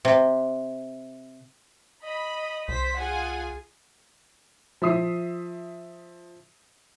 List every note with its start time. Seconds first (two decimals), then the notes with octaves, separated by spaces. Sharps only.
0.05 C3
2.03 D#5 B5
2.68 C2 C5 B6
2.97 F4 G#4 F#5 G#5
4.82 F3 E5 D#6 C7